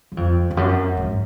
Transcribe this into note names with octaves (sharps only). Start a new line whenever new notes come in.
F#2
F2
F2
F#2
G#2